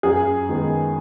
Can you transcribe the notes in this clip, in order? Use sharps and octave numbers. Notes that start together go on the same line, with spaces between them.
F#2 G#4
D#3 G#3 B3